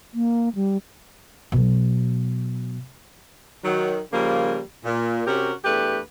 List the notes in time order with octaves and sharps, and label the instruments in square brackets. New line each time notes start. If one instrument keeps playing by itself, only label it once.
[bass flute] A#3
G3
[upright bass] B2 F#3
[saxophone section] D#3 F#3
C#3 F3 G3 A#3
A#2
C3 C#4 F#4 G4 A#4
E2 A3 D4 G4 B4